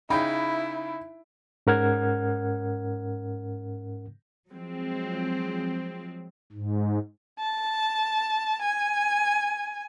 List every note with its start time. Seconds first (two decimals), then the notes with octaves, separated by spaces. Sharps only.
0.10 C#3 D#4 E4 G5 B5
1.67 G#2 C#4 A#4 F#5 F6 G#6
4.49 F3 F#3 G#3 C4
6.52 G#2
7.39 A5
8.62 G#5